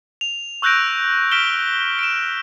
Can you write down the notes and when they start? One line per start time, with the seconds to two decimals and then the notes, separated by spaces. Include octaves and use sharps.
0.21 F7
0.62 C#6 E6 F#6 G6 A#6 D7
1.32 F6 B6 D7 E7 G7
1.99 D7 E7